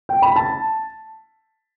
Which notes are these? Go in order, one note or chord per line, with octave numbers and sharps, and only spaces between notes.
G5
B5
A5